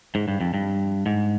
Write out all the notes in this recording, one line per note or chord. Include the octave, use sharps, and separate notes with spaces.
G#2
G2
F2
G2
G#2